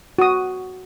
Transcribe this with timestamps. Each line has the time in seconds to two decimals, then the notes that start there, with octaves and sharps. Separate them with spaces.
0.19 F#4 D#6